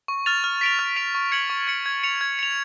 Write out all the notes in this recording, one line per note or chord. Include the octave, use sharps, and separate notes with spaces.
C#6
F6 A6 F7
F6
B6 D7 F7
F6
B6 D7 F7
C#6
G#6 C#7 F#7
C#6
G#6 C#7 F#7
G#6
C#7 F7
G#6
C#7 F7